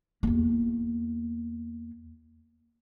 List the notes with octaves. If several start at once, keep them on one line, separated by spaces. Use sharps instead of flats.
E2 A#3